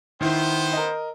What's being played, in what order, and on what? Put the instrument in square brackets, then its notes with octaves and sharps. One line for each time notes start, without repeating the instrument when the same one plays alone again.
[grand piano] D#3 E4 [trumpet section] B3 C5
[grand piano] A#4 D#5